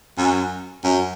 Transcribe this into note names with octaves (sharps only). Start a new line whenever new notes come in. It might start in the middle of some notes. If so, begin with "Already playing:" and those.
F#2
F#2